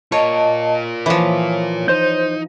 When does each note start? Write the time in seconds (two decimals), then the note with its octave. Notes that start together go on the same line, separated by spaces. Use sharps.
0.12 F4 A#4 C#5 D#5 A5
1.06 E3 F3 C#5
1.88 D#4 C5 G6